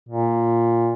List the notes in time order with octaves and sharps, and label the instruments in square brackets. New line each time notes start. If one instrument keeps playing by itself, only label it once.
[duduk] A#2